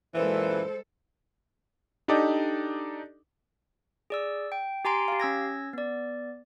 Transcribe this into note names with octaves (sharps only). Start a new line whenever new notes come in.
F#2 A#2 E3 G#3 A4 B4 C5
D4 D#4 G4 A4 D5 D#5
G#4 D5 E6
G5
G4 G#5 A#5 C6 D7
G4 F5
C#4 E6 G#6 A#6
B3 D5